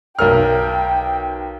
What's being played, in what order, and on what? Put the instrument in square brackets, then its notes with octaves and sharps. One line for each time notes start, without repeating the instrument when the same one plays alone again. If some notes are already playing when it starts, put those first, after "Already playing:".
[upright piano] B1 A#4 F6 [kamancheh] G5